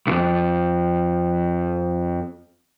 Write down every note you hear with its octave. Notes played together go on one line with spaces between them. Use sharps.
B1 F2